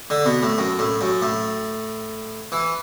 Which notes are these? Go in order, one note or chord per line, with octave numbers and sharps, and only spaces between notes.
D3
B2
A2
F#2
A2
F#2
A2
E3